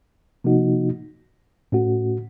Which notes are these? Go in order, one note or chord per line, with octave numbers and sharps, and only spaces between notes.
C3 F3 A#3 D#4 F#4
A2 A3 C#4 F#4